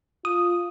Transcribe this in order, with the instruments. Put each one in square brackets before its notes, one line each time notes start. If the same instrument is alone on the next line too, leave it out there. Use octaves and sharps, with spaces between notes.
[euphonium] F4 [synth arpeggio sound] D#6